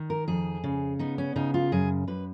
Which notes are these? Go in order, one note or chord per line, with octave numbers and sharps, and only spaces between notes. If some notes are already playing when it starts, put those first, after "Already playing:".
Already playing: D#3
A#4
F2 G#4
C#3
B3 D#4
C#4
C#3 D#4
F4
F#2 G#4
F#2 B4